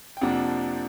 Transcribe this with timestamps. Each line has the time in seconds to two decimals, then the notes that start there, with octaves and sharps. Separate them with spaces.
0.17 G5
0.21 F2 C3 F3 A#3 D4 F#5